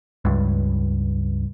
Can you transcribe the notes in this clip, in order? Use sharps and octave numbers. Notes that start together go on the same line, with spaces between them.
C#2 G2